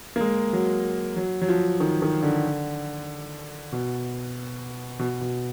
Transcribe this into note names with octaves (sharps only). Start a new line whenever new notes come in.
A#3
G#3
F#3
F#3
F#3
F3
D#3
D#3
D3
B2
B2
B2